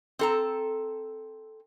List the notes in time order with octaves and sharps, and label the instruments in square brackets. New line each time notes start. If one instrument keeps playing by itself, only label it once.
[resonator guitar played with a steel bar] C4 A4 A#5